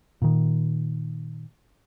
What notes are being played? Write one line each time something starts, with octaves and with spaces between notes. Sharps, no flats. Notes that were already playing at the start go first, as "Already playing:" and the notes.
A#2 D#3